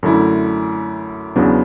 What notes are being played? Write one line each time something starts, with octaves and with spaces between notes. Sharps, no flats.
F#2 D3 A3 E4
E2 C#3 F#3 B3 D4